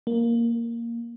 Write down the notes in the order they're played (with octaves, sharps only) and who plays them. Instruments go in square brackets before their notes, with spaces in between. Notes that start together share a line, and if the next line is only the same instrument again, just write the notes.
[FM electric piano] A#3